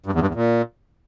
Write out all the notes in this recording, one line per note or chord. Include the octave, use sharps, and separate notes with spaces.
G2
E2
G2
E2
A#2